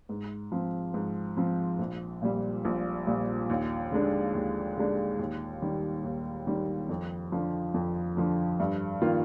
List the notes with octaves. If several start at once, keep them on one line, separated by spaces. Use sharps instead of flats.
G#2
F3 C4
G#2
F3 C4
A#1
A#2 G3
A#1
A#2 G3
D#2
D3 G#3 D4
D#2
D3 G#3 D4
D#2
D#3 G3
D#2
D#3 G3
F2
D3 F3
F2
D3 F3
G2
D#3 A#3 F4